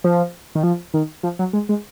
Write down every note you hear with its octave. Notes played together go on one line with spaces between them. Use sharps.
F3
D#3
F3
D#3
F3
F#3
G#3
G#3